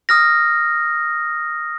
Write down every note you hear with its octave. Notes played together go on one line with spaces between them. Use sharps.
D#6 F6 A#6